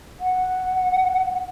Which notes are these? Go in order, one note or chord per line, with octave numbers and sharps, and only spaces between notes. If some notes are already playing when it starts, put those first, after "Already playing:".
F#5